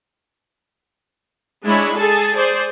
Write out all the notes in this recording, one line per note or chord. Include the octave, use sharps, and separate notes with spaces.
G#3 D4 E4 C#5
G#4 A4 A5
G#4 C5 D5